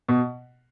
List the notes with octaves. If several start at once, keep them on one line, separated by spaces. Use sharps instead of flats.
B2